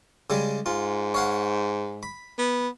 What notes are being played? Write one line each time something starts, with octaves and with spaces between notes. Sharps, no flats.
C#3 G3 G#3
G#2 F4
C#5 F5 F#5
B5
B3